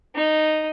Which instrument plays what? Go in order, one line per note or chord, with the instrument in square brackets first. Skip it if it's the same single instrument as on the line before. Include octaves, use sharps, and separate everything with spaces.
[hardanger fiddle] D#4